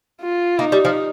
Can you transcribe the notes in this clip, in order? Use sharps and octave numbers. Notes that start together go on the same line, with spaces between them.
F4
A#3 D#4
G3
F3